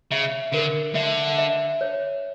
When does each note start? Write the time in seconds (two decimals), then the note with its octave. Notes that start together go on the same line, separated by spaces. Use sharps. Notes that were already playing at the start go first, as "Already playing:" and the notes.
0.11 C#3 E5
0.53 D3 A#4
0.95 D3 E5
1.38 E5
1.81 C#5